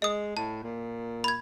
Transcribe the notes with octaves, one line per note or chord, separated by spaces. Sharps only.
G#3 D#5 D#6
A2 A5
A#2
B5 G#6